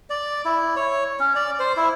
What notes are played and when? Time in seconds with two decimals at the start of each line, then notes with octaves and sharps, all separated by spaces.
0.10 D5
0.45 E4
0.76 C#5
1.20 C#4
1.36 D5
1.60 C5
1.77 E4